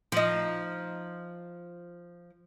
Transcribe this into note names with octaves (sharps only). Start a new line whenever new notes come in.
F3 D#4